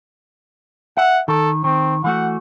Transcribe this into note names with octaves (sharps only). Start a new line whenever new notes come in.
E5 F#5
D#3 A4
D#3 C4
E3 A3 F#4 F#5